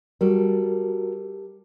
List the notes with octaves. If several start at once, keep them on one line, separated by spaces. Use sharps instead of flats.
G3 F#4 A4 A#4